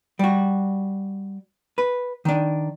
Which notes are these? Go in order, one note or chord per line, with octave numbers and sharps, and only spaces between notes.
G3 F#4
B4
D#3 D4